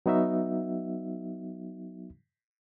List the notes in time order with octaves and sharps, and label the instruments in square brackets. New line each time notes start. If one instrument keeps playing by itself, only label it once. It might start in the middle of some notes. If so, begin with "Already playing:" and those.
[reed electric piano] F#3 B3 D#4 F#4 E5